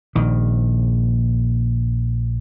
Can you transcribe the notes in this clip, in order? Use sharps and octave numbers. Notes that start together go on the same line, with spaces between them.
A#1 D#3